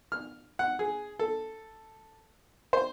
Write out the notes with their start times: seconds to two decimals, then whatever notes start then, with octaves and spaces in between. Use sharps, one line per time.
0.12 F6
0.59 F#5
0.79 G#4
1.19 A4
2.73 C5